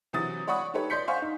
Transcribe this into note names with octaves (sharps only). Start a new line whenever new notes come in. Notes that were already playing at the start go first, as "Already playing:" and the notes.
C3 E3 F#3 F#4 D#6 A6
C#5 D5 F#5 B5 C#6 D#6
D#4 G4 A4 B4 C#5
D5 D#5 C6 G6 B6 C#7
C5 F5 F#5 G#5 C#6
D#4